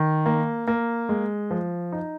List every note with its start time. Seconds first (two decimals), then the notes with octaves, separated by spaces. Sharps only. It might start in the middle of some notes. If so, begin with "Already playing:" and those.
Already playing: D#3
0.26 A#3
0.68 A#3
1.09 G#3
1.51 F3
1.92 D#4